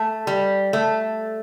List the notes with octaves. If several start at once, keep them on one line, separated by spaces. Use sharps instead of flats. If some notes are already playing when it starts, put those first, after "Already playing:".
Already playing: A3
G3
A3